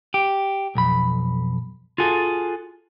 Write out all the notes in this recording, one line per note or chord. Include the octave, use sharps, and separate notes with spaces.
G4
B1 F2 B5
F4 F#4 G#4 A4